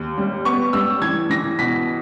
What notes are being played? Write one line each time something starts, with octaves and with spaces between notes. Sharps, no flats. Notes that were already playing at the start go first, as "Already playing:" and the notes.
Already playing: D#2
G3
B3 C#6
G3 E6
E3 G#6
E3 A#6
B2 B6